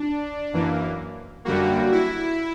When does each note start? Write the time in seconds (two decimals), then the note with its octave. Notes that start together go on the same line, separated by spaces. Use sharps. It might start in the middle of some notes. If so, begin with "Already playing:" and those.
Already playing: D4
0.53 F#2 E3 A#3
1.45 F#2 D3 G3 A#3 F#4
1.92 E4